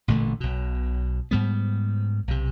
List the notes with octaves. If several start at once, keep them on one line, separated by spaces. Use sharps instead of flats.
A1 A#2 D3 A3
B1 B2
G#2 G3 B3
B1 C3